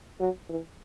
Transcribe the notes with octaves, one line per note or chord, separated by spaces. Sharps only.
F#3
E3